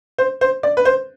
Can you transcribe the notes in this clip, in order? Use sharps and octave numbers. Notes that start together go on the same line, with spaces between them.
C5
C5
D5
B4
C5